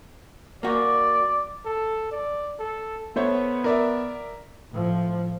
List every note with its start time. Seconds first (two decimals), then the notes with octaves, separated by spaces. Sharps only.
0.63 A#3 F#4 D5
1.65 A4
2.11 D5
2.59 A4
3.16 A3 B3 C5 C#5
3.64 A#4 D5 E5
4.72 A2 F3